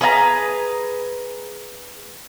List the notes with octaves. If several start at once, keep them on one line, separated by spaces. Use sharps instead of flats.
G#4 B4 E5 A#5